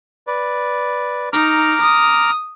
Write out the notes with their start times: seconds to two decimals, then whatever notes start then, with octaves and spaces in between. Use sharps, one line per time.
0.27 B4 D5
1.33 D#4 A#5 D6 F6
1.81 D#6